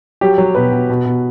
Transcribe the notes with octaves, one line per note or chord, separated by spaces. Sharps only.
F#3 G4
F#3
B2 B4
B2
B2
B2